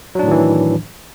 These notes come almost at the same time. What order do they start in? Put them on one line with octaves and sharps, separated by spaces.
F#3 D4 A2 D#3 E3